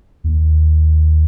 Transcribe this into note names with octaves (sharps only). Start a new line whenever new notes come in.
D#2